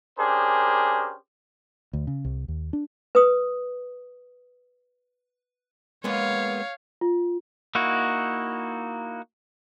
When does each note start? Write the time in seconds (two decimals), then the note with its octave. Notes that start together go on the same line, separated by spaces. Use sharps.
0.18 C#4 D4 G4 G#4 A#4 C5
1.93 D2
2.07 C#3
2.25 C2
2.48 D#2
2.73 D4
3.15 B4 D#6
6.04 G#3 A#3 B3 C#5 F5
7.01 F4
7.75 A#3 D#4 E4 F#4